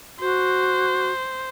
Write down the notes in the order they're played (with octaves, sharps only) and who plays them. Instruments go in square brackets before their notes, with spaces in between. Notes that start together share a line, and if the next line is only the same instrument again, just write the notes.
[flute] F#4 [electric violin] C5